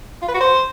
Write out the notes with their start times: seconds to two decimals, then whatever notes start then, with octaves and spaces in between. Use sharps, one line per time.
0.22 F4
0.28 B4
0.34 F#4
0.41 C5